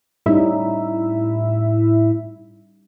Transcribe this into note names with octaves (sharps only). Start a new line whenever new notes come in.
A2 G3 C#4 D#4 E4 E5